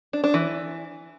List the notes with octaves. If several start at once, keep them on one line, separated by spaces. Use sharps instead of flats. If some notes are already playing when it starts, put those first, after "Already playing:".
D4
D4
E3